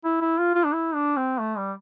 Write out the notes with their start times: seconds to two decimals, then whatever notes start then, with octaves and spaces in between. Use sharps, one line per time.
0.04 E4
0.21 E4
0.38 F4
0.55 F4
0.65 D4
0.73 E4
0.94 D4
1.17 C4
1.40 A3
1.57 G3